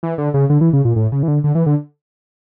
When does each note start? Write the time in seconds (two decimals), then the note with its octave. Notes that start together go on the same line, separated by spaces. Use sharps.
0.03 E3
0.18 D3
0.34 C#3
0.50 D3
0.61 E3
0.73 C#3
0.85 A#2
0.96 A2
1.12 C#3
1.23 E3
1.28 D3
1.44 D3
1.55 E3
1.66 D3